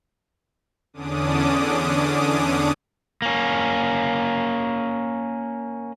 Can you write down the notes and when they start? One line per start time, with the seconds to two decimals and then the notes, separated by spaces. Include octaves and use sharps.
0.94 E2 D3 C#4 D4 D6 D#6
3.22 A#3 C#4